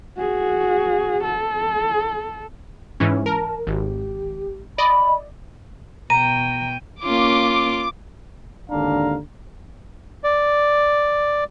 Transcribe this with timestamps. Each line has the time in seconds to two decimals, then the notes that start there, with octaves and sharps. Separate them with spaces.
0.17 F#4 G#4
1.23 A4
3.00 G#2 E3 C#4
3.26 A#4 A5
3.67 G#1 G4
4.78 D5 D#5 B5
6.10 B2 G5 A#5 D#7
7.04 A#3 C#4 F4 D6
8.70 G#1 D#2 D3 D4 F5 A#5
10.24 D5